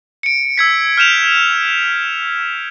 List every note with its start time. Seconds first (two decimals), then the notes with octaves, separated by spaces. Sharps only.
0.23 C#7 D7
0.58 E6 G#6 B6
0.97 F6 G6 E7 F7